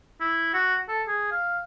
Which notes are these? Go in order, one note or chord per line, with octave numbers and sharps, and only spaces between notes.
E4
F#4
A4
G#4
F5